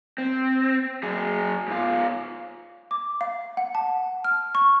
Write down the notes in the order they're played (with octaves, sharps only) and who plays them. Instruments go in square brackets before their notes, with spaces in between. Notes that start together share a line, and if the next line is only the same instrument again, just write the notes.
[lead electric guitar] C4
F#3 G#4
G#2 F4
[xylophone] D6
F5
F#5
A5
F6
C#6